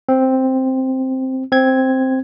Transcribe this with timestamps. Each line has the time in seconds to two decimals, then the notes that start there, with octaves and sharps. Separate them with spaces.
0.09 C4
1.52 C4 G#6